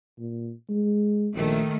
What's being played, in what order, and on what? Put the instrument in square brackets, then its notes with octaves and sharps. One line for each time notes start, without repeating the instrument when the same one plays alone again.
[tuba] A#2
G#3
[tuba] A#1 [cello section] D#3 A3